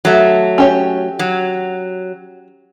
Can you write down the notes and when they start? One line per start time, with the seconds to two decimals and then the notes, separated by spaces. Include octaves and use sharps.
0.05 F#3 A3
0.58 C#4 G4 C#5
1.19 F#3